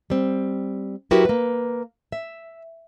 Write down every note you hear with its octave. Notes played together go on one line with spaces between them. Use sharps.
G3 C4
F#3 E4 F#4 G4 A#4 B4
A#3 B4
E5